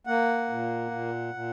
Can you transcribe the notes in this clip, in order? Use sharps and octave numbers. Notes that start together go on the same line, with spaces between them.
A#3 F#5
A#2
A#2
A#2